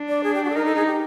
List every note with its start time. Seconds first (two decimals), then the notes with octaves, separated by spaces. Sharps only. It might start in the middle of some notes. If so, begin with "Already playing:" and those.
Already playing: D4
0.09 D5
0.24 G#4
0.35 G4
0.45 F#4
0.50 A4
0.55 D#4 A#4
0.66 A4
0.76 G#4
0.86 G4